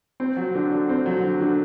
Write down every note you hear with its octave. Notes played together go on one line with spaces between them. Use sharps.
C4
F#3
D3
D3
C4
F#3
D3
D3